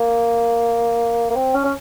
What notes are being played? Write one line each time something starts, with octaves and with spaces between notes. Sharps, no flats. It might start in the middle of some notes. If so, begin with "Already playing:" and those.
Already playing: A#3
A#3
C4
C#4
C#4